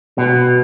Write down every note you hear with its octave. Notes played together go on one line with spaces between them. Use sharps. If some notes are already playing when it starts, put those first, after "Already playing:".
B2